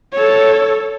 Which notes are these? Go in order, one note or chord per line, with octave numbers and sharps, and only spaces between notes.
A4 C#5